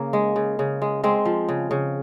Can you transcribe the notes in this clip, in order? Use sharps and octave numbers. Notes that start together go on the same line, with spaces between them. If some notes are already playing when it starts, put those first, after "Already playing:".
Already playing: C#3 A#3
G#3
C#3
C#3
G#3
G#3 C4
F3
C#3
C#3